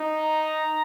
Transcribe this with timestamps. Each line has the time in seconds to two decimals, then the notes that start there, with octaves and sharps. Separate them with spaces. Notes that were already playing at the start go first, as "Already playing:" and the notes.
Already playing: D#4
0.22 A#5